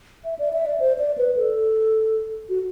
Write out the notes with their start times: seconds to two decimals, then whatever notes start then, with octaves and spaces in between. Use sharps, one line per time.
0.24 E5
0.39 D5
0.53 E5
0.66 D5
0.80 C5
0.99 D5
1.18 B4
1.36 A4
2.49 F#4